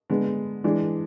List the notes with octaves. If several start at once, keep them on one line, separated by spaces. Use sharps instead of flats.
D3 G#3 B3
E3 G#3 D4